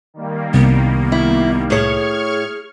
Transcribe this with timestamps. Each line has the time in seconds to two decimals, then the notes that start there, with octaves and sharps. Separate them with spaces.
0.14 D#3 G3 A#3
0.54 C2 B3
1.12 E4
1.70 A2 G#4 C#5 C#6 F6 G#6